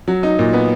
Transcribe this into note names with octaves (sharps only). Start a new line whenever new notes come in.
F#3
D#4
A#2
B3